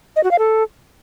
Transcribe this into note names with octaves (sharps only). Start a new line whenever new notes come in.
D#5
F#4
F5
A4